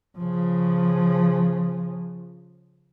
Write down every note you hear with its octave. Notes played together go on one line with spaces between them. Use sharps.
C#3 F3